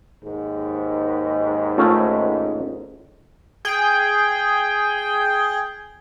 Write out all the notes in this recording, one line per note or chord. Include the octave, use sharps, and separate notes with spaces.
D#2 G#2
A3 C#4 F4
G#4 G5